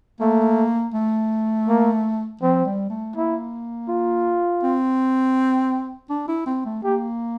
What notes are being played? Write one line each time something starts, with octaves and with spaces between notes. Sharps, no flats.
A3 A#3
A3
A#3
F3 C4
G3
A3
A#3 E4
F4
C4
D4
E4
C4
A3
A#3 G4